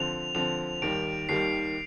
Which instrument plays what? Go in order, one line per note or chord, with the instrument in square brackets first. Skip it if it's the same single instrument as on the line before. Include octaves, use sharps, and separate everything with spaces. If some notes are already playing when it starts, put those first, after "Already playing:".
Already playing: [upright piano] D3 F3 C4 [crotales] F7
[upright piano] D3 F3 C4 [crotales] F7
[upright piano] D#2 D#3 G3 [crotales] D7
[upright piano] D#2 D#3 G3 [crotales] C7